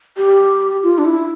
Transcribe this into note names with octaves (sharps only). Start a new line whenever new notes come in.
G4
F4
D4
E4